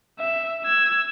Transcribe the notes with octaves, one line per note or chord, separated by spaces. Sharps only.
E5
E6 G#6